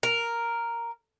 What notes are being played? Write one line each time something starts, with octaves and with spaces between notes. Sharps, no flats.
A#4